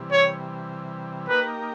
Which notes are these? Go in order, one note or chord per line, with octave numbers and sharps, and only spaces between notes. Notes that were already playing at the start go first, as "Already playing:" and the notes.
Already playing: C3 E3 G3
C#5
A#3 D#4 G4 A#4 B4